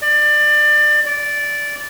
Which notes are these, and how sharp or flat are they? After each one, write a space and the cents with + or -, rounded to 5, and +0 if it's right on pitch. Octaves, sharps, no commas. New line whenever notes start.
D5 +25
D5 -10